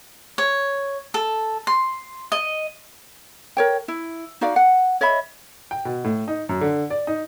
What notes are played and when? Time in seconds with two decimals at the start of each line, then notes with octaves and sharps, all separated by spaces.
0.38 C#5
1.14 A4
1.67 C6
2.32 D#5
3.57 A#4 C#5 G5
3.88 E4
4.41 D#4 F#4 D5 F5
4.56 F#5
5.01 C#5 D#5 E5 B5
5.71 G5
5.85 B2
6.04 A2
6.28 D#4
6.49 F#2
6.61 D3
6.90 D5
7.07 D#4